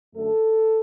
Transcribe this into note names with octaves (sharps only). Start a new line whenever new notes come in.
F#2 D3 A3 A4